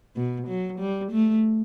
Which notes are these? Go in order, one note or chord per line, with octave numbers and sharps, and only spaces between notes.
B2
F#3
G3
A3